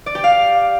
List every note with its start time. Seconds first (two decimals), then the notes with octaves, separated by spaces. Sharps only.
0.06 D5
0.15 G4
0.24 F5